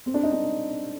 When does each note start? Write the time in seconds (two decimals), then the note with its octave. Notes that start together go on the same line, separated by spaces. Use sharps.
0.06 C4
0.14 D4
0.23 D#4
0.32 D4